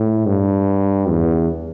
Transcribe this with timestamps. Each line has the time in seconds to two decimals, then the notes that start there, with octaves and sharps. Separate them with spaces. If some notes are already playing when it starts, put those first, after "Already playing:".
Already playing: A2
0.26 G2
1.09 E2